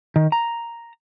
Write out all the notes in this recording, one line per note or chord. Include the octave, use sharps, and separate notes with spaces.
D#3
A#5